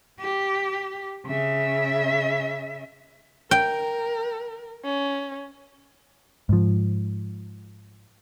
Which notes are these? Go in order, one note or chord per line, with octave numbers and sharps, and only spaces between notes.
G4
C#3 E5
A#4 G5
C#4
G#2 F3